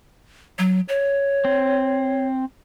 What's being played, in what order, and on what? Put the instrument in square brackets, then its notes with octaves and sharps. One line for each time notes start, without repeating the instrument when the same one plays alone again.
[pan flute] F#3
C#5
[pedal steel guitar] C4